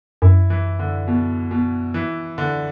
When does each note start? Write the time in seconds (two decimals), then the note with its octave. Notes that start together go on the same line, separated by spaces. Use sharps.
0.22 F#2 E4
0.50 E3
0.79 D3
1.08 B2
1.51 B2
1.94 E3
2.38 D3